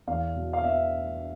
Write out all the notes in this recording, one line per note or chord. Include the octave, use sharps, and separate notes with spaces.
E2 F5
B2
F5
B3 E5